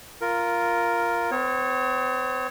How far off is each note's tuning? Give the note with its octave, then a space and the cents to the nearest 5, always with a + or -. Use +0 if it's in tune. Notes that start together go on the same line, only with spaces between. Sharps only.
F4 -5 A#4 +0
C4 -45 C#5 -20